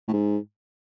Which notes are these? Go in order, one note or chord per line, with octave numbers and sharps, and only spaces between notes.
A2
G#2